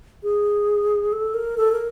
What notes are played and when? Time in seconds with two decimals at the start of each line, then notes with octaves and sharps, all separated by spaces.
0.23 G#4
1.12 A4
1.34 A#4
1.57 A4
1.72 A#4